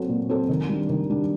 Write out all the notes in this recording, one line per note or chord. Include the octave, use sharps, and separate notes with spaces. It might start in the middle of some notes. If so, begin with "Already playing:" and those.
Already playing: F#3 C4 F#4 A4
A#2
F#3 C4 F#4 A4
D#3
G3 D4
D#3
G3 D4